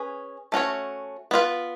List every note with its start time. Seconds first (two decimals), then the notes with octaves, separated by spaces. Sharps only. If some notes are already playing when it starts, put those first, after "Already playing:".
Already playing: C#4 G#4 B4
0.52 A3 C#4 F#4 C#5
1.31 B3 F4 B4